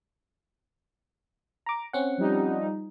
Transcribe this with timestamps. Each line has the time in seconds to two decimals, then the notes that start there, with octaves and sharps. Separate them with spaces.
1.66 A#5 D6
1.93 C4 C#4 F#5
2.18 F3 G3 D#4